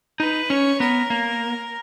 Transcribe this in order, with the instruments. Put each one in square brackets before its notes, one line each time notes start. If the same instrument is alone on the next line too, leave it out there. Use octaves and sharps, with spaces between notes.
[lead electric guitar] D#4 [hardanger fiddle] B4
[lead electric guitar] C#4 [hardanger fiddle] C#5
[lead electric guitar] B3 [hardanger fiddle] A#4
[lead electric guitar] A#3